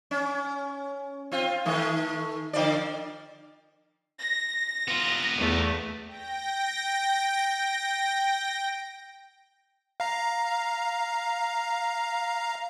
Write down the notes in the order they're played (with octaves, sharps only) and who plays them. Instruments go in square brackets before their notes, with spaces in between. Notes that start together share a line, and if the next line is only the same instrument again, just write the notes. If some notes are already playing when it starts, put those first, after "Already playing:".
[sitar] C#4
C4 F4
D#3 A3
D3 F3 D5
[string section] A#6
[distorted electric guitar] B3 F4
[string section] E2 A3
[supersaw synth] G5 A#6
[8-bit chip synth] F5 A#5